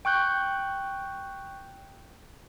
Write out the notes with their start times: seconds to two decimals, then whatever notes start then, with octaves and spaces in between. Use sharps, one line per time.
0.05 G5 C#6 F#6 G6